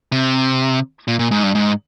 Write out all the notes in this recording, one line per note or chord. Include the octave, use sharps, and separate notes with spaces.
C3
A#2
A#2
G#2
G2
G#2